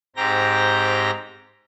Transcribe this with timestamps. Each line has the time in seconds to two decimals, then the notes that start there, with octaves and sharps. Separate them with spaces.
0.16 G#2 C4 G4 G5 A#5 A#6